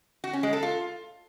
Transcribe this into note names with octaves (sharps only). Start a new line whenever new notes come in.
F#4
C#4
G#3
A4
F4